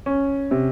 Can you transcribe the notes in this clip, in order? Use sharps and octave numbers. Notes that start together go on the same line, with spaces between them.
C#4
C3